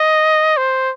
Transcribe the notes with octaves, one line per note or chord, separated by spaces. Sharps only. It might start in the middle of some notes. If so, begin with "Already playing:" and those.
Already playing: D#5
C5